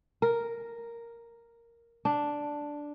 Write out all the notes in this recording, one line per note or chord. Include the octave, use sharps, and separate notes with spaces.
A#4
D4